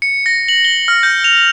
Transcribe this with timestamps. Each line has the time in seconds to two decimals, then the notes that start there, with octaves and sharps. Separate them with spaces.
0.02 C#7
0.26 A#6
0.48 F#7
0.65 G7
0.88 F6
1.03 G6
1.24 F7